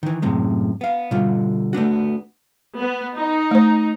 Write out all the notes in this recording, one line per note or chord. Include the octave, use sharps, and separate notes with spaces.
D#3 E3
F#2 A2 C3 G#3
B3 F5
B2 D3 G3 F4
A3 B3 D4 F#4
B3
D#4
A3 C5